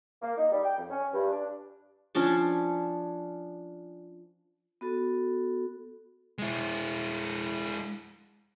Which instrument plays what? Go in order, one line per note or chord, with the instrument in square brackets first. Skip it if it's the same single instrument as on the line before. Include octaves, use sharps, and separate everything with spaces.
[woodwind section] A#3
D#4
G3
G5
F2
C#4
G2
D4
[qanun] F3 C#4 D4 A5
[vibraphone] B3 F#4 A4
[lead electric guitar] G#3 E4